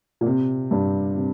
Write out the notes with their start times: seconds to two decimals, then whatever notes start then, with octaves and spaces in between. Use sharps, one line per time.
0.21 A#2
0.26 C3
0.71 G2
1.16 C3